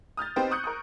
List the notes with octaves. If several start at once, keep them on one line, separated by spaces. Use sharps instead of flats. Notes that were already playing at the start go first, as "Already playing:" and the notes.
D#6 F6 G6 A6
B3 C4 D#4 G4 C5
C#6 D#6 F#6 G6 C#7
A#4 C#6 D#6